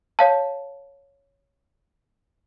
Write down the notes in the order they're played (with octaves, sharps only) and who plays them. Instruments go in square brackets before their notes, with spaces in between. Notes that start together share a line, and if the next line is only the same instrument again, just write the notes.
[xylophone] C#5 F5 A5